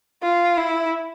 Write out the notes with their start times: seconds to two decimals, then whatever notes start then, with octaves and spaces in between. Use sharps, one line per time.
0.23 F4
0.57 E4